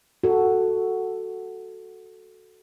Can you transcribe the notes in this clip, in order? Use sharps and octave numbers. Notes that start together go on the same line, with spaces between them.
F#4 A4